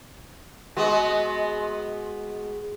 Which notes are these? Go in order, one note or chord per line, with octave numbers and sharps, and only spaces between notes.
G#3 B3 F#4